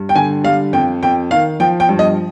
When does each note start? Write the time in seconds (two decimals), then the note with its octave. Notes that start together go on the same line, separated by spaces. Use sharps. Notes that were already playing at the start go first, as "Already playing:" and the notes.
Already playing: G2
0.09 G5
0.15 D3 G#5
0.44 G3 F5
0.73 F2 G5
1.02 F2 G5
1.31 D#3 F5
1.60 F3 G5
1.80 G5
1.89 G2
1.99 D#5